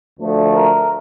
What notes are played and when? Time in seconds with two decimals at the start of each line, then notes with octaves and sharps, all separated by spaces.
0.19 D2 D3 F3 A3
0.53 A#4